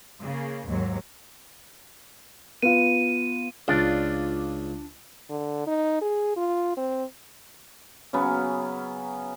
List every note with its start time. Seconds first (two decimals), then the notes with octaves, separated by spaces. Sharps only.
0.22 C#3 A#3
0.66 D#2 G#2 F#3
2.62 B3 F4 D#7
3.68 C#2 D4 F4 D5
5.30 D3
5.67 D#4
6.02 G#4
6.37 F4
6.77 C4
8.13 C#3 F#3 B3 C#4